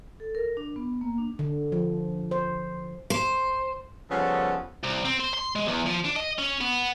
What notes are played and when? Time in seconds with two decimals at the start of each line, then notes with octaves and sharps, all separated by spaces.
0.20 A4
0.35 A#4
0.57 D4
0.76 B3
1.01 A#3
1.18 D4
1.39 D3
1.72 F3
2.31 C5
3.10 C5
4.11 C#3 F3 G3 B3 C#4 A4
4.84 C2
5.05 C4
5.20 C5
5.34 C6
5.56 G#3
5.68 E2
5.86 F3
6.05 D4
6.16 D#5
6.38 C#4
6.61 B3